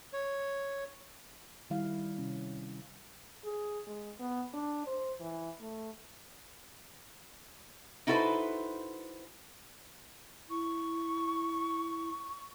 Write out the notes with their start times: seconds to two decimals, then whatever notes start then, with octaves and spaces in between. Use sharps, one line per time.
0.13 C#5
1.70 D#3 G3 E4 F5
2.18 C3 C#4
3.44 G#4
3.87 G#3
4.20 B3
4.54 D4
4.87 C5
5.20 E3
5.60 A3
8.07 D#4 E4 F#4 A4 B4 C5
10.49 E4 C#6